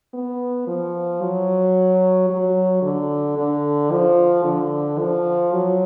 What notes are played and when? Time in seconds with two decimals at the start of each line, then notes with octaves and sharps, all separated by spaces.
0.14 B3
0.67 F3
1.22 F#3
2.30 F#3
2.82 D3
3.37 D3
3.91 F3
4.44 D3
4.99 F3
5.52 F#3